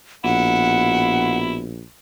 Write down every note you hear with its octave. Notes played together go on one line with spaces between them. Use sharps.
A#1 B2 E4 F#5